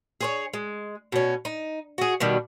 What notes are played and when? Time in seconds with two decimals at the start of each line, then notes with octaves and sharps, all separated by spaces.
0.21 G#4 C5 C#5
0.54 G#3
1.12 B2 C#4
1.45 D#4
1.98 F#4 G#4
2.20 B2 D#3 G3